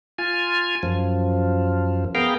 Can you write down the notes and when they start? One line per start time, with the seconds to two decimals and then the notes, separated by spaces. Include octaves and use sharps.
0.18 F4 G#5
0.83 F#2 F3
2.15 B3 G#4 A#4 F5 G5